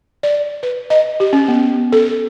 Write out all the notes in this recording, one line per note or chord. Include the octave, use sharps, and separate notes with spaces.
D5
B4
D#5
G4
C#4
B3
A4